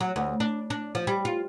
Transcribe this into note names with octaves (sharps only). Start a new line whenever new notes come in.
F#3
D2
D4
D4
F3
G3
F4